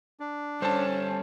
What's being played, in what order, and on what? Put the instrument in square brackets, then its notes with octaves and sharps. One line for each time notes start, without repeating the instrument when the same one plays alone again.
[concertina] D4
[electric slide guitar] G3 A4 [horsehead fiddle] C#4 [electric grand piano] C5 A5